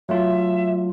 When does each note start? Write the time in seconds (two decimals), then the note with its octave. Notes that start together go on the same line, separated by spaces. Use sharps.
0.09 F#3 A3 F4 E5